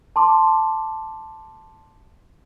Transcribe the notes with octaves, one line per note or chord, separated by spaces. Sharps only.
A5 C6 D6